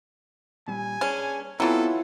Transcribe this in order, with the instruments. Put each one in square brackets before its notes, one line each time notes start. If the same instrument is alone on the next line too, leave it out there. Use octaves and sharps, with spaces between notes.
[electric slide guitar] A#2 G3 [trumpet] G#5
[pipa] C#4 [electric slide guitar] D4 G#4 B4
[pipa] E3 F#3 [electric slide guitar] B3 C4 [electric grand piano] E4 F4 [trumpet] A4